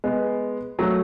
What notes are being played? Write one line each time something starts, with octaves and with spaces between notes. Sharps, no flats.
G#3 B3
F#3 A3